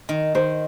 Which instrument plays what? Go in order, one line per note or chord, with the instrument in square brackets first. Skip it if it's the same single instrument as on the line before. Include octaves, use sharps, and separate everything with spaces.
[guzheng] D#3
[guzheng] D#3 [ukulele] C5